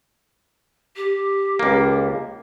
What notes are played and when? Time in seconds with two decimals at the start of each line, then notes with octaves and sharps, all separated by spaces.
0.96 G4
1.59 C#2 A#3